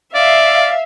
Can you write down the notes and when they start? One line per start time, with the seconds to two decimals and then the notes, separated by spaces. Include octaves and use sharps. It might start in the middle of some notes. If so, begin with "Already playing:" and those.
0.15 D5 E5 F5